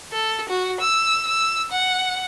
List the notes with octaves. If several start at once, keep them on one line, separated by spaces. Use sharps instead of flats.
A4
F#4
E6
E6
F#5